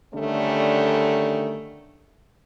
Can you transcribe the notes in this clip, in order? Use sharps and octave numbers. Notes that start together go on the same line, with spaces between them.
D3 D#3 G3 A3 C#4